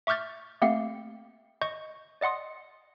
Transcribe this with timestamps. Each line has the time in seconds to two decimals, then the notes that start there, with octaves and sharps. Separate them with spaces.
0.07 E5 C#6 D6 F6 G6 A6
0.62 A3 A#3 C4 G4 F5 F#5
1.61 D#5 C#6 G6
2.21 D5 D#5 F#5 C6 D#6